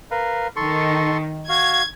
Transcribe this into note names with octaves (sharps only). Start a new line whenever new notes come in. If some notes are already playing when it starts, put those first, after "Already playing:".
A#4 B4 F5
D#3 A4 C6 C#6
F#4 F5 G#6